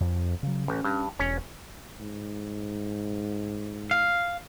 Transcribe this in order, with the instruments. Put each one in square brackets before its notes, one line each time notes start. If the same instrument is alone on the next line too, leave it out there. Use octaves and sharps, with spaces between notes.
[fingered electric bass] F2
C#3 F#3
[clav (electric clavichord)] A1 [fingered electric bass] C#4
[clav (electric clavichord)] G2
[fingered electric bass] E1 [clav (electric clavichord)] C#4
[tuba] G#2
[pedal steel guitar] F5